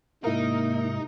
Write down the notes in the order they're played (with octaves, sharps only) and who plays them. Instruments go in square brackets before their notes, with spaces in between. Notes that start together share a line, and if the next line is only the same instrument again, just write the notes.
[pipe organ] G#2 C3 G#3 [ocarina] A#3 [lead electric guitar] D#4 [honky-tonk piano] E4 A#4